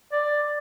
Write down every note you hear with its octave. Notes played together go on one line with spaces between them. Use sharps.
D5